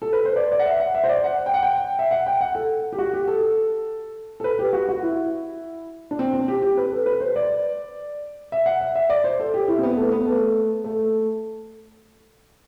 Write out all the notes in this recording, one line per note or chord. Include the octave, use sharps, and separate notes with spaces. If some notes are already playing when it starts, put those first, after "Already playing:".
A4
B4
C5
D5
D5
F#5
E5
F#5
E5
C5
D5
F#5
G5
F#5
G5
E5
F#5
G5
F#5
A4
G4
F#4
G4
A4
A4
B4
G4
F#4
F#4
E4
D4
C4
C4
G4
G4
B4
A4
B4
C5
D5
E5
F#5
E5
E5
D5
C5
A4
G4
E4
C4
B3
A3
B3
A3
A3